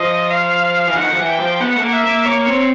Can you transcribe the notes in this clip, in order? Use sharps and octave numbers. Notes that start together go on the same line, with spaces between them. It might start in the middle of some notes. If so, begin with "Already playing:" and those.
Already playing: F3 D#5
F5
E3
D#3 F#5
F3
E3
G5
F3
B3 F#5
A3
A#3
E5
A#3
A#3 C#5
C4